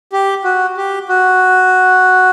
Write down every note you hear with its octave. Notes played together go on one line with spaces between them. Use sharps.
G4
F#4
G4
F#4